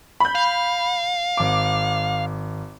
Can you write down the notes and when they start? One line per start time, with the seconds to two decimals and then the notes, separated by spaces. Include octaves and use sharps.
0.20 B5 G6
0.35 F5
1.37 G#1 D6